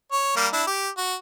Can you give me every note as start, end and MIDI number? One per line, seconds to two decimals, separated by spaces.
0.12 0.36 73
0.36 0.47 55
0.36 0.47 58
0.53 0.62 62
0.53 0.62 64
0.67 0.89 67
0.98 1.15 66